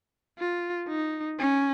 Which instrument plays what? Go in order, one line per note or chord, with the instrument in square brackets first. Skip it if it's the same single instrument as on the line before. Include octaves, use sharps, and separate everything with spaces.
[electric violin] F4
D#4
C#4